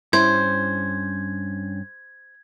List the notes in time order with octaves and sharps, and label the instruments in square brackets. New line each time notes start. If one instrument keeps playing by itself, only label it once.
[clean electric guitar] G2 C#4 [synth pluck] E4 [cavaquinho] C5 [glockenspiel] G#6